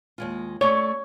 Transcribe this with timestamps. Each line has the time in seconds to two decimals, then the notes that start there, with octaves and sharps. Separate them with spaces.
0.18 D#2 G#3 F4
0.61 A3 C#5 D5